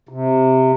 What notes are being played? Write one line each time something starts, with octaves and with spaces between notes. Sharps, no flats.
C3